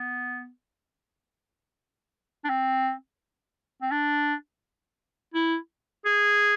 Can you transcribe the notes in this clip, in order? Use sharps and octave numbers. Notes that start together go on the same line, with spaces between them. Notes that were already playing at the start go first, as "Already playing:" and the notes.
Already playing: B3
D4
C4
C4
D4
E4
G#4